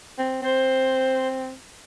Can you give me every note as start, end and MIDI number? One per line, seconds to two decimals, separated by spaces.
0.18 0.42 60
0.42 1.53 60
0.42 1.28 72